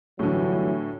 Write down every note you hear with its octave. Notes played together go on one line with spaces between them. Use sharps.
G1 A2 D3 E3 F#3